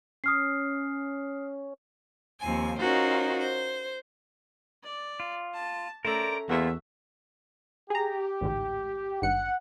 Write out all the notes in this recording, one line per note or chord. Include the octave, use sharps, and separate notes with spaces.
C#4 D#6 F6 C7
D#2 F3 C4 G#5
C#4 D#4 F4 F#4 A#4 C5
C5
D5
F4
A5
A3 C#4 A4 A#4 C5 D5 A#5
E2 A#3 F4 F#4 E5
G4 G#4 A#5
A1 D2 G#2
G#1 G2 F#5 C#7